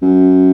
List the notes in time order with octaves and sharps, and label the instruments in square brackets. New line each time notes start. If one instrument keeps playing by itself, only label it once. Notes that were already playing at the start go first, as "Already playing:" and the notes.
[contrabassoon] F#2